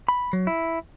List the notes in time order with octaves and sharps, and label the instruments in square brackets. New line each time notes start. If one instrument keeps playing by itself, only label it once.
[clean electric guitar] B5
F#3
E4